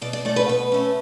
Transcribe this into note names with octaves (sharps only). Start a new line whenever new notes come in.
B2 D5
D5
A3 C#4 D5
B4
B2 B4
A3 C#4